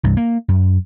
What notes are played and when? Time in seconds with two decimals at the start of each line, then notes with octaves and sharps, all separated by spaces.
0.03 C2 G2
0.17 A#3
0.48 F#2